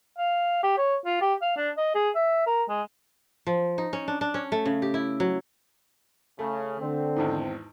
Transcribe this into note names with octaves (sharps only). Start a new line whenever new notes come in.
F5
G4
C#5
F4
G4
F5
D4
D#5
G#4
E5
A#4
G#3
F3
D#4
C#4
D4
D4
C#4
A3
C#3
G4
E4
F#3
C#3 A3
D3 C4
G#1 E2 G#2